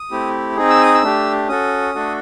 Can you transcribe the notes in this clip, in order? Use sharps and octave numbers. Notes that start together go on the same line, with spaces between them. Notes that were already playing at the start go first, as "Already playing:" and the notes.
Already playing: D#6
A3 C4 E4 G4
C4 D#4 G#4
E6
D#6
E6
A3 D4 G4
C#4 F#4 A4 D#6
A3 D4 F#4 A4